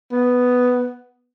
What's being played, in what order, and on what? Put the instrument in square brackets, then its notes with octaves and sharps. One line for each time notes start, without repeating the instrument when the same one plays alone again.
[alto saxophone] B3